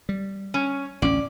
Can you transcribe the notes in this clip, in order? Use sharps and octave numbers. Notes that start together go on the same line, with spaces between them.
G3
C#4
A1 D2 C#4 D5